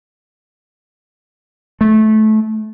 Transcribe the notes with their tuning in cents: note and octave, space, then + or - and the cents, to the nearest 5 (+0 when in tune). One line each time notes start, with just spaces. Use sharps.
A3 -20